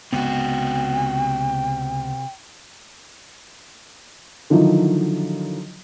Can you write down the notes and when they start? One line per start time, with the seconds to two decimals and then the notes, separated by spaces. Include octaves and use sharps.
0.12 C#2 C3 B3 F#4 G5
4.50 D3 D#3 F3 F#3 D#4 E4